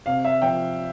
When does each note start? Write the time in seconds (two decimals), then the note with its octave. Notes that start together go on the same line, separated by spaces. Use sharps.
0.06 C3 F5
0.24 E5
0.42 F3 G5